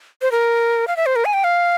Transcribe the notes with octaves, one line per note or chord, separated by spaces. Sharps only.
C5
A#4
F5
E5
C5
A#4
G#5
G5
F5